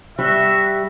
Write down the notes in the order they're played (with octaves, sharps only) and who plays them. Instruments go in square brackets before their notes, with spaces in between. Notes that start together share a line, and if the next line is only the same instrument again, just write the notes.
[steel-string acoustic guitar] G3 [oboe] F#4 [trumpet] E5